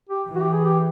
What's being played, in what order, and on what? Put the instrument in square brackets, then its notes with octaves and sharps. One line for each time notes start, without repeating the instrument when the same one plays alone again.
[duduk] G4
[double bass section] E3
[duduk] F#4
G4
G#4
G4